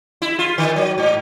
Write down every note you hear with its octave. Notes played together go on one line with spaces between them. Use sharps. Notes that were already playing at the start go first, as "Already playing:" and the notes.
E4
F4
D#3
F#3
G#2